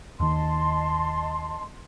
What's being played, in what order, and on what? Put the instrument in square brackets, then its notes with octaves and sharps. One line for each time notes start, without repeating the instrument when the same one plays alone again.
[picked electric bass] D#2 D#3 [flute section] D#5 A5 C6